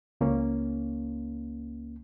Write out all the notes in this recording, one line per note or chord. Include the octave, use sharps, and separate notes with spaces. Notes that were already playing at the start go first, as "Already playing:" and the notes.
C#2 A#3 C#4